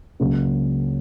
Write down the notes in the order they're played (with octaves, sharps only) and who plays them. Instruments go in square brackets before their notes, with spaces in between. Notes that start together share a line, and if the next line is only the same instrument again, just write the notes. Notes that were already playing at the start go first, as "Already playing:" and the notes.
[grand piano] C#2 C#3 F#3 A#3 C#4